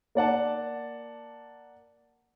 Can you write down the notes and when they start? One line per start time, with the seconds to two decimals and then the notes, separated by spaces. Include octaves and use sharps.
0.15 A#3 D5 F#5 A5